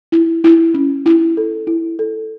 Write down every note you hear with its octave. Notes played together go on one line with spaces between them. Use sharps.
E4
E4
C#4
E4
A4
E4
A4